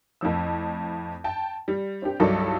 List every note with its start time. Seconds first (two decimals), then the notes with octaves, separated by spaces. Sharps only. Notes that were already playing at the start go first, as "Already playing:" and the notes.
0.21 F2 A2 F3 E6
1.24 G5 A5
1.68 G3
2.02 C4 D4 G4
2.20 C2 G2 F#3 D#4 A4 D6